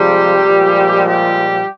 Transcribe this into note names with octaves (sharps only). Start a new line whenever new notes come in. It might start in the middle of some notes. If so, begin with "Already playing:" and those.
Already playing: C3 F3 G3 G#3 G4
A#2 F3 G#3
G3 G4